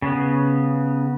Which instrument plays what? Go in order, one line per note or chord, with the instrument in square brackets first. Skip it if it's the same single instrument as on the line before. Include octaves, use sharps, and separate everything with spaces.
[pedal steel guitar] C#3 B3